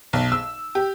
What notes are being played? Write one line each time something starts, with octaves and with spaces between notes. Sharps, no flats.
B1
E6
G4